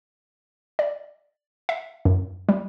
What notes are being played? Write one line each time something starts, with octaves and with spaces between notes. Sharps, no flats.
D5
E5
F#2
G3